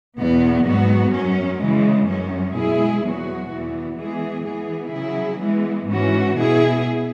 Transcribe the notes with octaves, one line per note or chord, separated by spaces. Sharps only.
E2 B2 B3
G#2 F#3 B3 F#4
F#2 F#3 C#4
C#3 E3 G#3
F#2 F#3 C#4
B2 G#3 E4 G#4
E2 B2 F#3 B3 F#4
E2 E3 B3
E3 G#3 B3 G#4
E3 B3 G#4
C#3 F#3 E4 G#4
E3 G#3 B3
G#2 E3 C#4 F#4
B2 B3 E4 G#4